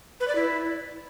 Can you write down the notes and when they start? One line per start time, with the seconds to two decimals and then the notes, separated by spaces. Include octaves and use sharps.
0.20 B4
0.28 D5
0.35 E4